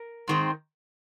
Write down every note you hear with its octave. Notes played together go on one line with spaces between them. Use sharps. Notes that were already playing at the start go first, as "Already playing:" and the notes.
Already playing: A#4
G#2 D#3 G#3 C4